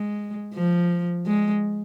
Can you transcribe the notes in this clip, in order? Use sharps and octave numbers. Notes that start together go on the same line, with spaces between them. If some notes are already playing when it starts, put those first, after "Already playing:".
Already playing: G#3
F3
G#3